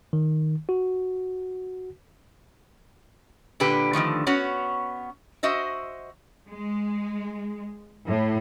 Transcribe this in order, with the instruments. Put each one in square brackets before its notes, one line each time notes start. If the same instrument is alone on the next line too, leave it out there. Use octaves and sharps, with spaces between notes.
[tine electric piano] D#3
F#4
[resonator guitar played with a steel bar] A#2 D3 G4 B4
D3 D#3 F3 A3
B3 C#4 F#4 C#5
F#4 C5 D#5 E5
[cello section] G#3
A2